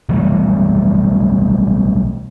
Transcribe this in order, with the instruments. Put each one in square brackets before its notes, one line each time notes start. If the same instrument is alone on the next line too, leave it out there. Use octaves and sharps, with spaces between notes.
[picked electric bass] B1 E3 G3 A3